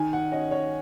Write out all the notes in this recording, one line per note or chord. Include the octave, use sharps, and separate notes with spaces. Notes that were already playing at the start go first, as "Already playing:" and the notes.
Already playing: D#3 G#5
F#5
C#4 D#5
C#5